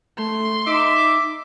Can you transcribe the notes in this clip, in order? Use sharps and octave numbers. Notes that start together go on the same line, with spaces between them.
A3 C6
D#4 E5 D6